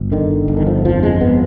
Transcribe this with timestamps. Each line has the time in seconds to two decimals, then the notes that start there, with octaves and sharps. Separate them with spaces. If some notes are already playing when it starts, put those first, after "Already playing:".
Already playing: G1
0.12 D3 D#3
0.48 G1
0.57 D#3
0.67 F3
0.85 F2 F3
1.03 G#3
1.20 G1 B3